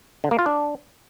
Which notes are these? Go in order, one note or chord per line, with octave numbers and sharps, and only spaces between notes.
D3
A#3
F4
D4